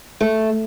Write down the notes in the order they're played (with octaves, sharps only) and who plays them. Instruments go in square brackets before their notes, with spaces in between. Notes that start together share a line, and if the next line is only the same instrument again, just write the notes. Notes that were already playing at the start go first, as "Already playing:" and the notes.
[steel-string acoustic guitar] A3